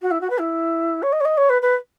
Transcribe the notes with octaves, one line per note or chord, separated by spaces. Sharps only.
F#4
E4
F#4
B4
E4
C#5
D#5
C#5
D#5
C#5
B4
B4